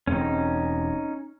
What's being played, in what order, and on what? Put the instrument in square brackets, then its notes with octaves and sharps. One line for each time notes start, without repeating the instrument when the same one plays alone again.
[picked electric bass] E1 C4 [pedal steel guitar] C#4 D#4